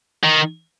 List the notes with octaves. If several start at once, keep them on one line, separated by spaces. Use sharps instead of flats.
D#3